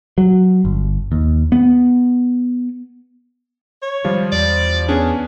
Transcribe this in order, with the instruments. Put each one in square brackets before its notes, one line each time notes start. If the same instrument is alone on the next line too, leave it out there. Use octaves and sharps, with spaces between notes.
[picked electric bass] F#3
G1
D#2
B3
[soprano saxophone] C#5
[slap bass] D#3 G#3 [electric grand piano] F3 G3 F4
[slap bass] E2 [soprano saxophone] D5
[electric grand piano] B3 C#4 D4 [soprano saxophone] G#4